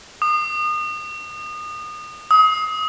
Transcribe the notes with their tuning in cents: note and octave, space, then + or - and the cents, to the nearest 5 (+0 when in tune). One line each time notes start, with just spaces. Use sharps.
D#6 -30
D#6 +35